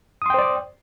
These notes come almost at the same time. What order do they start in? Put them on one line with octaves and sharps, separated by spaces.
D#6 C6 G5 C5 D5